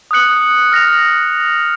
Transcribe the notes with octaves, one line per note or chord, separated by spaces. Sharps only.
D#6 F#6 C#7 F#7
F6 A#6 F7